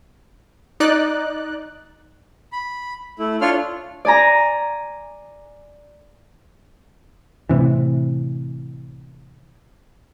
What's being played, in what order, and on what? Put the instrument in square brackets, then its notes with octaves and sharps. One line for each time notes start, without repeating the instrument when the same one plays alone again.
[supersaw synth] D#4 D5 F#6
[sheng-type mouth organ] B5
A3 E4
D4 F4 C#5 C6 F6
[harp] D5 G#5 A#5
[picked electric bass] A2 C3 E3